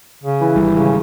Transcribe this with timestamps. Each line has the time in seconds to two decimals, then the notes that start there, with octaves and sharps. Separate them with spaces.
0.23 C#3
0.40 E3
0.56 G#1 C#2 G3
0.74 C#3